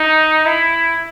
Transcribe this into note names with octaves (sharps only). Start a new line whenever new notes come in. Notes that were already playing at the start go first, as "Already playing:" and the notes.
Already playing: D#4
E4